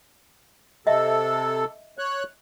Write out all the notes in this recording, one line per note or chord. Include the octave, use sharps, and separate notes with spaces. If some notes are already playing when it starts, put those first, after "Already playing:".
C3 A4 D#5 E5
C#5 F#6